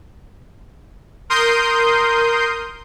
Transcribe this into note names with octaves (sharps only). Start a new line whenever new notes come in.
A#4 C6 D#6 G6